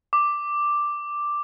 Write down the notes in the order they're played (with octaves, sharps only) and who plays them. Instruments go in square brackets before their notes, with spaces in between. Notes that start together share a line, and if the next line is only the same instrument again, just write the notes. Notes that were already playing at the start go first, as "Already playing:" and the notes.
[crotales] D6